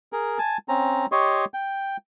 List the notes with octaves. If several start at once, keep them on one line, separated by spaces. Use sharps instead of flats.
G#4 A#4
G#5 A5
C4 C#4 A#5
G4 C#5 D#5 C6 C#6
G5